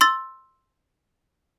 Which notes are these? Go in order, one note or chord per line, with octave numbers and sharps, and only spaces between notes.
C6 E6 A6